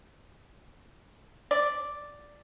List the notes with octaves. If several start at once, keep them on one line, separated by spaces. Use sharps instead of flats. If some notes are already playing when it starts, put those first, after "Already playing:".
D5